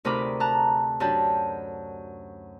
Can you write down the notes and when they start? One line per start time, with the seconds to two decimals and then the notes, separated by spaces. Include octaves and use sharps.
0.05 D2 C3 D#4 A#4 B5 D6
0.40 A5 A#5 F#6
1.00 F#2 D4 G4 A5 G6